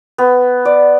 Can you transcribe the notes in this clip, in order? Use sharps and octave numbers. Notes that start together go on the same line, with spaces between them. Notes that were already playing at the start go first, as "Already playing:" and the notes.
B3
D5